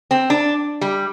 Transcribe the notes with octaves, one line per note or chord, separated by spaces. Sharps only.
C4
D4
G3